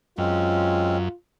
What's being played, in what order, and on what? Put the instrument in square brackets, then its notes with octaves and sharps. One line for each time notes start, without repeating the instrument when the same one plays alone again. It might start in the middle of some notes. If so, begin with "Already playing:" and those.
[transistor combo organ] F#2 [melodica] G#3 C4 C#4 [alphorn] F4